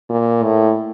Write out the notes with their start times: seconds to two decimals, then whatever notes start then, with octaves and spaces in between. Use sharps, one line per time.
0.09 A#2
0.43 A2